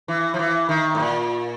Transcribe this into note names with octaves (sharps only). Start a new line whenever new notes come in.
E3
F3
E3
D#3
A2
A#2